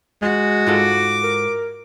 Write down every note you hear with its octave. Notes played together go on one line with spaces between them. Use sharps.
G#3 F#4
G#2 F4 A4 D6
A#4